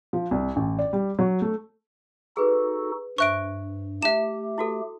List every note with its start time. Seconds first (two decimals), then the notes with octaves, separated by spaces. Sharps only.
0.13 F3
0.31 C2
0.56 A1
0.79 D5
0.93 G3
1.19 F#3
1.42 A3
2.37 D#4 F#4 G#4 A4 B4
3.18 G2 C5 E5 C#6 F#6 D7
4.03 A3 E4 G4 E5 E7
4.58 E4 F#4 A4